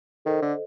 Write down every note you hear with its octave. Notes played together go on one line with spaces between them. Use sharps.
D#3 A4 C5 D#5
D3